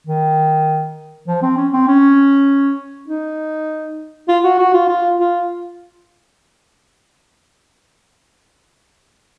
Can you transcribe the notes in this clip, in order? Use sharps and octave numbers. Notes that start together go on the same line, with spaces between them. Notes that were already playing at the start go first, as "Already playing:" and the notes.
D#3
F3
C4
C#4
C4
C#4
D#4
F4
F#4
F#4
F4
F4
F4